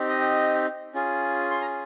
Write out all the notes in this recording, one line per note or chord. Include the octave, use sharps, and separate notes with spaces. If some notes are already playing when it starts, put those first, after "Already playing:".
Already playing: C4 D#4 G4
D#5
C#4 F4 G#4
C6
A#5